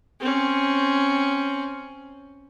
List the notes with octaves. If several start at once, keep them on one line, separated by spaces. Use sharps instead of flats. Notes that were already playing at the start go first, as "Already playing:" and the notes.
C4 C#4